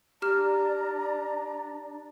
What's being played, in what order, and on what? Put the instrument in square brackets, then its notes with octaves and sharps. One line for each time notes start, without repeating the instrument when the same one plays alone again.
[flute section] D4 D5 [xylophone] G4 F6 [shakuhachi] A#5